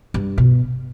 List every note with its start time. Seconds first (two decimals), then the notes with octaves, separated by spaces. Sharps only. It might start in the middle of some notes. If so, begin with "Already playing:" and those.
0.14 G2
0.38 B2